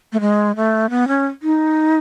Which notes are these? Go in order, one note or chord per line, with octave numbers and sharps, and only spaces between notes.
A3
G#3
A3
B3
C#4
D#4